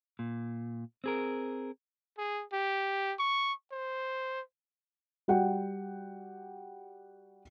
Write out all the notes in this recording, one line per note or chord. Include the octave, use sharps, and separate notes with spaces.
A#2
C4 G#4 A#4
G#4
G4
C#6
C5
G3 F#4 F#5 G5